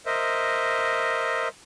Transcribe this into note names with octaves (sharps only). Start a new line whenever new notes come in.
A#4 C5 D#5 E5